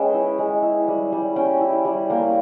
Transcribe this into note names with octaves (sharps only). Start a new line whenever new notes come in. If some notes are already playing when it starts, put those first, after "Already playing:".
Already playing: G#3 C#4 B4 C#5 E5 G5
E4
G#3
E4
G3
G3
C#4 G5
E4
G3
A#3 G5